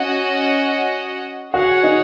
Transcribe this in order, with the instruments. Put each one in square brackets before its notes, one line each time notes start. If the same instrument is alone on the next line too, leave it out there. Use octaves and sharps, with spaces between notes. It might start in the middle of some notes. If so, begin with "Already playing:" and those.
Already playing: [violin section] C#4 F#4 D#5 F#5
[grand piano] F#4 [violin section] G#4 C#5 F#5
[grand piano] D#4